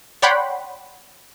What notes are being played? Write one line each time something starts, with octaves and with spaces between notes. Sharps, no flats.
C#5 D5 F#5 G5 B5 C6